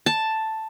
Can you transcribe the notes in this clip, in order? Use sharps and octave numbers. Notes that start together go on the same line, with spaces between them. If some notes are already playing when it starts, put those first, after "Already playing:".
A5